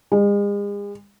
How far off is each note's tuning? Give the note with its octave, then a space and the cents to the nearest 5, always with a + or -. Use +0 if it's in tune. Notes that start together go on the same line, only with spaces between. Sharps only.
G#3 -40